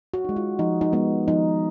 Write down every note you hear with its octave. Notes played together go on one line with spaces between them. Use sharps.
F#4
G#3 D#4
F4
F3 D#4
D#4
G#3 B3 D#4
F3 D#4